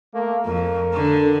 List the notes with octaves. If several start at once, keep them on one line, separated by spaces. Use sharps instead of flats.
A3 A#3
F2 A#4
D3